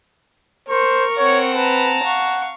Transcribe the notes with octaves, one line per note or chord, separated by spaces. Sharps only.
A#4 C5 C#6
C4 C#5 F#5
B4 A5 A#5
F5 F#5 C#6